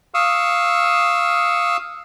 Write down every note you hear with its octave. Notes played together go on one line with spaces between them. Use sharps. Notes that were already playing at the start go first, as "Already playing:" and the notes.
F5 C#6 D#6 E6